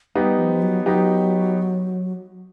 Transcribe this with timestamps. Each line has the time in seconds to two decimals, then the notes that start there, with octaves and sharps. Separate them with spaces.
0.15 G3 B3 D#4 G4
0.38 F3
0.62 F#3
0.85 F#3 B3 D#4 G4